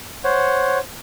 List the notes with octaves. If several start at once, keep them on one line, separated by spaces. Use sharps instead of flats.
C5 C#5 F#5